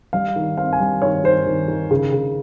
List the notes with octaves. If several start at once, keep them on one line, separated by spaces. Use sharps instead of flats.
G3 F5
D#3
C4 F5
G#5
G3
D#3 C#5
D#3 C5
D#3
D#3
C#3
C#3